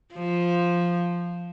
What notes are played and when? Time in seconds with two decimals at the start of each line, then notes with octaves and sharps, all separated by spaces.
0.14 F3